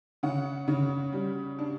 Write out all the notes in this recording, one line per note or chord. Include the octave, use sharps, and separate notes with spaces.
C#3 F#5
C#3
G3
D4